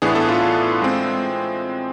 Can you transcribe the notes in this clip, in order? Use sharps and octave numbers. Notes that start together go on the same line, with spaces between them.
A2 E3 B3 D4 G#4
A4
F4
G#3 C4